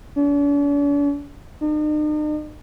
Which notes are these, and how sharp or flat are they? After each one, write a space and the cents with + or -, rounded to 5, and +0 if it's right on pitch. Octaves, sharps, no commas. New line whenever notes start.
D4 -45
D#4 -45